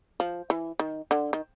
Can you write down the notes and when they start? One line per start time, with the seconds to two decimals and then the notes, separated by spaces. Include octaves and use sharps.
0.20 F3
0.50 E3
0.79 D#3
1.11 D3
1.33 D#3